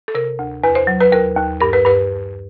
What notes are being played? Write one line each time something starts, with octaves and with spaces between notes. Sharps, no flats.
A4
C3 A#4
D2
E2 B4
C5
F#3
B4
D#2 A#4
D#2
G2 A#4
B4
G2 B4